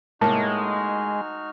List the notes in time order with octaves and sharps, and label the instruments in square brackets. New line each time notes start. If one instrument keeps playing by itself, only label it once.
[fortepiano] A2 A#3 [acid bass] G#3 [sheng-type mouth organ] D#4 F#4 F6 [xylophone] A5